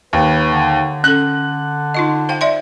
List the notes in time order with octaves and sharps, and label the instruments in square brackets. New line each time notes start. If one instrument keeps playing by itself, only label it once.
[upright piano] D#2 [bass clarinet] B4
[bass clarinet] D3
[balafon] C#4 A4 [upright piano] F#6
[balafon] D#4 F4 D#5
C5 F5 G5
D5 E5 C6